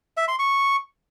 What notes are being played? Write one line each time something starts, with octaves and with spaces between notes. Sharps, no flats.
E5
C6
C#6